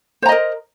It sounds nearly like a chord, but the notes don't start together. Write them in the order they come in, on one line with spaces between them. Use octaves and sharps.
C5 A#5 D#5 A#4